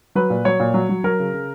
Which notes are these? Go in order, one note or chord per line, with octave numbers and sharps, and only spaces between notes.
F#3 B4
A#2
F#3 C#5
A#2
F#3
F#3
F#3 A#4
C#3
C#3